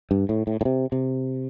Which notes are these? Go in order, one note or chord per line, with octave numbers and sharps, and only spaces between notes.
G2
A2
A2
A2
C3
C3